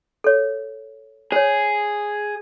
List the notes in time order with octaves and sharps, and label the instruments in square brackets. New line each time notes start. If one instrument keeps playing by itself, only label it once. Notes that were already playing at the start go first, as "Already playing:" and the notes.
[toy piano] A4 C#5
[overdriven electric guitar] G#4 [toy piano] C5 C#5